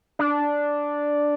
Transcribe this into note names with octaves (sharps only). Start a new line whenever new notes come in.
D4